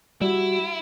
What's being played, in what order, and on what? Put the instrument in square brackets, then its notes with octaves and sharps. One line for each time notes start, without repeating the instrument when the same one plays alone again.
[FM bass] G3 [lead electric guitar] E4 [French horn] F#4